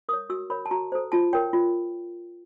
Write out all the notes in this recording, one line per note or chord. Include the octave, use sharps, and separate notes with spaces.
A#4 C#5 D#6
F#4 E6
A#4 C#5 B5
A5
F#4 A#5
A4 C5
F4 A5
A#4 C#5 G5
F4